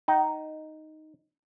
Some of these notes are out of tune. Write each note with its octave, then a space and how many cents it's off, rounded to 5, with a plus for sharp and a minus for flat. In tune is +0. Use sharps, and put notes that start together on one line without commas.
D#4 +0 G5 -40